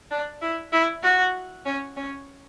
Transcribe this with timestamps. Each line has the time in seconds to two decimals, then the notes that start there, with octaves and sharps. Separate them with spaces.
0.11 D4
0.42 E4
0.73 E4
1.03 F#4
1.66 C#4
1.97 C#4